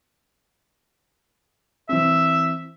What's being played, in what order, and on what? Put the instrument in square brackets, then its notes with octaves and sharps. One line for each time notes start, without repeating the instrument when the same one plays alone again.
[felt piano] E3 C4 [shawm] E5